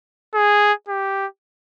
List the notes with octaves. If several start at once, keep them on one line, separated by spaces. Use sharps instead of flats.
G#4
G4